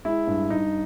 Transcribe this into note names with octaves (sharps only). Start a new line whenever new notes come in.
G#3 E4
G2
G2 D#4